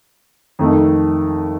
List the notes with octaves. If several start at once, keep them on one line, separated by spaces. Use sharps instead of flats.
F2 D#3 A3